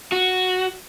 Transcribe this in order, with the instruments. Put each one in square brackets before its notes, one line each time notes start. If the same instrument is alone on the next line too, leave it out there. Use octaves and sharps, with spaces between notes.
[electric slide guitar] F#4